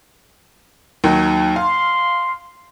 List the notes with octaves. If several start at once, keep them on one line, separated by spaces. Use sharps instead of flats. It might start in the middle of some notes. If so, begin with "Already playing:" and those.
D#2 D#3 F#3
F5 C6